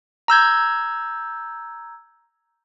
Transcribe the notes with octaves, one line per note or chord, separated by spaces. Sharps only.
A#5 E6 G6 G#6